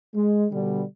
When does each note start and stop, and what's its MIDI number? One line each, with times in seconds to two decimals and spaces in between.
0.14 0.45 56
0.51 0.82 47
0.51 0.82 50
0.51 0.82 55